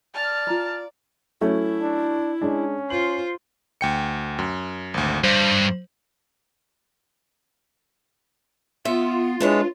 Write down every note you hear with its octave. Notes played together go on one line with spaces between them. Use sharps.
D5 A5 F6
F4 A#5
F#3 A3 C#4 E4
D4
G#3 C#4 D4
F4 C5 F#7
D2 G5 C#7
F#2
G#1 D2
G2 C5
B3 F4 E5
G#3 D4 E4 B4 C#5